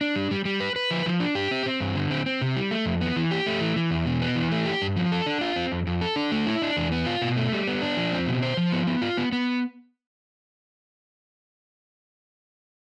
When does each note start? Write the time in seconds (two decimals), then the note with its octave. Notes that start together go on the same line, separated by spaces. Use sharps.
0.01 D4
0.16 G3
0.31 G3
0.45 G3
0.60 B4
0.76 B4
0.91 F3
1.06 F3
1.20 D4
1.35 G4
1.51 C4
1.66 C4
1.80 G2
1.95 D3
2.11 C4
2.26 C4
2.42 C3
2.56 G3
2.71 A3
2.86 F2
3.01 B3
3.16 E3
3.31 G4
3.46 A3
3.61 E3
3.76 E3
3.91 E2
4.06 B2
4.22 B3
4.36 E3
4.52 A3
4.66 G4
4.82 G2
4.96 F3
5.12 A4
5.26 D4
5.41 F4
5.56 C4
5.72 F2
5.87 F2
6.01 A4
6.16 D4
6.32 A3
6.46 E4
6.62 D4
6.77 E2
6.92 B3
7.06 F4
7.22 B2
7.37 A3
7.52 G3
7.67 B3
7.82 D4
7.97 F3
8.12 C4
8.26 B2
8.42 C5
8.57 F3
8.72 B3
8.87 B3
9.02 F4
9.17 B3
9.32 B3